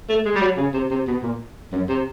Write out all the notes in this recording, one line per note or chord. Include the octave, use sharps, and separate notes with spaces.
A3
G#3
G3
F#3
C#3
C3
C3
B2
A#2
F#2
C3